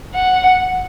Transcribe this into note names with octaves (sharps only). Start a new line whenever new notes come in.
F#5